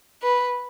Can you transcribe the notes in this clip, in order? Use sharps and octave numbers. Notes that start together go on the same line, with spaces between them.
B4